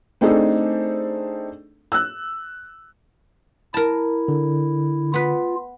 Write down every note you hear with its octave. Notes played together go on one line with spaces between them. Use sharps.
A3 C4 D4 D#4 G#4 A4
E6 F#6
E4 A#4 A5
D3
B3 F4 B4